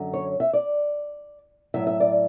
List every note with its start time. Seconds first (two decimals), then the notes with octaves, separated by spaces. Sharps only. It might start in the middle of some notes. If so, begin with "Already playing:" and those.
Already playing: F#2 D3 F#3
0.14 C#5
0.40 E5
0.53 D5
1.74 A2 F#3 E5
1.87 E5
2.00 D5